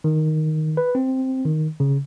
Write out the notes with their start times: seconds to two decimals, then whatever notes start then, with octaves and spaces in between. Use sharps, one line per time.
0.04 D#3
0.77 B4
0.95 C4
1.45 D#3
1.80 C#3